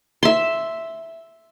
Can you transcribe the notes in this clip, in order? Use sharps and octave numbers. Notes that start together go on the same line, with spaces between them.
E5 C6